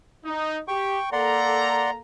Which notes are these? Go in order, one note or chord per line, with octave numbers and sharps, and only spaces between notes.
D#4
G4 G5 C#6
A#3 A4 D5 F#5 A#5 C6